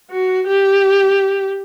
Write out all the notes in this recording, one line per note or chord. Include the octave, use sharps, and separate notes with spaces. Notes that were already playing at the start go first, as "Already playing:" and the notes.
F#4
G4